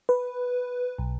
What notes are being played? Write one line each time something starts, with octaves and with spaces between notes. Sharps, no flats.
B4
B1